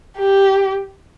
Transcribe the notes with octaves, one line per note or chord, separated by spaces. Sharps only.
G4